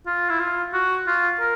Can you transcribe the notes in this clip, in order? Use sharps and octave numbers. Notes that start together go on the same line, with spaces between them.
F4
E4
F4
F#4
F4
A#4